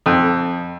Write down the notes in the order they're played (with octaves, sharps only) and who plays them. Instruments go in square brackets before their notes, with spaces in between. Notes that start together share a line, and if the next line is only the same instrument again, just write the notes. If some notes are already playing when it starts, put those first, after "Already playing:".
[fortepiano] F2